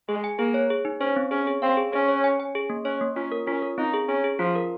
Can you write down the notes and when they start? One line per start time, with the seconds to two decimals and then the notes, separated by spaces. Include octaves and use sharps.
0.09 G#3 G#4
0.24 G#5
0.39 A#3 G#4
0.54 C#5
0.70 G#4
0.85 D#4
1.00 C#4 C5
1.16 C4
1.31 C#4 G#4
1.47 G#4
1.62 C4 F5
1.77 G#4
1.93 C#4 G#4
2.08 C#5
2.24 G#5
2.40 G#5
2.55 G#4
2.70 A#3
2.85 C#4 C#5
3.01 A#3
3.16 C#4 F4
3.32 A#4
3.47 C#4 F4
3.62 A#4
3.78 C4 D#4
3.94 G#4
4.09 C#4 G#4
4.24 G#4
4.39 F3 F4
4.55 A#4